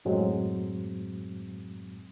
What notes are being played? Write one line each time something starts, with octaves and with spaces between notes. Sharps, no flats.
F#2 A2 F#3 G#3 C4